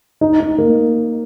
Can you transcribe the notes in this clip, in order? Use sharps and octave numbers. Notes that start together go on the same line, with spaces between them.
D#4
D#4
A#3